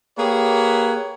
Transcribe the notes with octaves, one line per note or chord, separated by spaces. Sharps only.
A#3 G4 G#4 B4 C#5